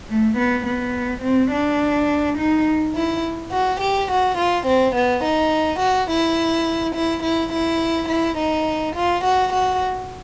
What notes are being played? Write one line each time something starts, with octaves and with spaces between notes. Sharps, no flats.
A3
B3
B3
C4
D4
D#4
E4
F#4
G4
F#4
F4
C4
B3
D#4
F#4
E4
E4
E4
E4
E4
D#4
F4
F#4
F#4